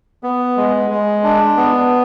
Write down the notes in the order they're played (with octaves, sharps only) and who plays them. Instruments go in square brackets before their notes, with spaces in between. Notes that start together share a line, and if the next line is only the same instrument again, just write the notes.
[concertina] B3
G#3
G#3
D4
B3